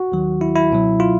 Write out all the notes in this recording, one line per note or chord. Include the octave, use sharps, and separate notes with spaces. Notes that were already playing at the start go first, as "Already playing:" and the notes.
Already playing: F#4
D#2 D#3 F#3
E4
E4
C#2 B2 F#3
F4